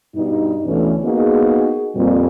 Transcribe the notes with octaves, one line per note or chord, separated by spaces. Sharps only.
G2 B2 G3 D#4
D2 B2 D3 E3 A3 C#4
A#3 B3 D#4 F#4 G#4
F2 A#2 G3